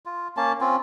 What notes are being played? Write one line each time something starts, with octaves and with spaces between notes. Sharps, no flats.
F4
A#3 C#4 A5
C4 C#4 F4